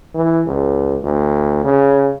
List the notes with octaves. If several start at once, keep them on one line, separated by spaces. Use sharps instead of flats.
E3
C#2
D2
C#3